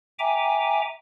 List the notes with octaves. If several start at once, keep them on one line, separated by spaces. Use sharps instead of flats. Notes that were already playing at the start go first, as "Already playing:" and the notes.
E5 G5 G#5 A#5 D6